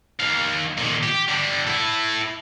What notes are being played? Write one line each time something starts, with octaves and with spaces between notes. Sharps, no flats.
D#3 F5
A#2 D#3
G4
D3 G3
E4 A4